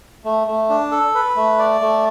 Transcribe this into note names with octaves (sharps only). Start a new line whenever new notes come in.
A3
A3
D4
A4
B4
A3
D5
A3